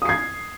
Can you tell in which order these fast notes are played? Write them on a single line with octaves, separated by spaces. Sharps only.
D#6 C7 G#6